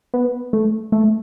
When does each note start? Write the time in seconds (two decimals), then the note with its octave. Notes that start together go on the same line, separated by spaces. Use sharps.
0.14 B3
0.53 A3
0.92 A3